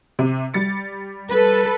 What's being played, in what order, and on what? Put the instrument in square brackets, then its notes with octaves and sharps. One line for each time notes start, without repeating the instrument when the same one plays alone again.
[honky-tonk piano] C3
G3 A6 C#7
[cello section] A4 B4